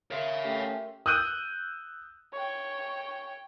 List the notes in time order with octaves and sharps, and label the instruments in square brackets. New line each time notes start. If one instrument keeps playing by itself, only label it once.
[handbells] A#4 E5 C6 [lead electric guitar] C#5 F5
[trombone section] A3 C#4 G4
[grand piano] D#6 E6 F#6 G6 D#7
[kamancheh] C#5 G5